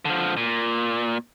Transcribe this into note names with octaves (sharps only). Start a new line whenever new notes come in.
D3 F3
A#2